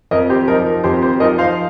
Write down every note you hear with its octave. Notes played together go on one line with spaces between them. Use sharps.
F2 A#4 D#5
G4 C5
F3 D#4 A#4
A#4
F2 G4 C5
G4 C5
F3 D#4 A#4 D#5
C5 F5